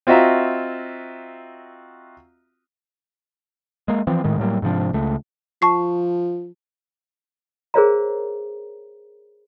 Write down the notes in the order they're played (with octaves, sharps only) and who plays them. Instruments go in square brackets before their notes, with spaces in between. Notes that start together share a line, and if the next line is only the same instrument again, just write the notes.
[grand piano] C4 F4 F#4 D#5 E5 A#5
[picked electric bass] G#3 A#3
E3 F3 C4
A2 D#3 G#3
A2 F#3 G3 A#3
G#2 C3 F3 D4
C#2 A3
[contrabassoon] F3 [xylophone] A5 C#6 C7
[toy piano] G#4 A#4 C5 C#5 E5 A#5